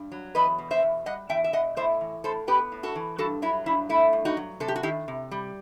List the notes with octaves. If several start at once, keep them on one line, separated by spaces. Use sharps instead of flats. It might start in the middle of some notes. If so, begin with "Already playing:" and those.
Already playing: G2
F#3
E2 B4 D#5
B2
C5 E5
E2
G3 D#5 F#5
E2 E5 G5
E5
B2 D#5 F#5
A2 C5 E5
E3
A2 A4 C5
B3 G4 B4
A2
F#4 A4
E3
G2 F#4 A4
F#3 E4
G2 E4
A3 E4
G2
D#4 F#4
F#3
C3 A4
G4
F#4
D#3 E4 G4
C3
G3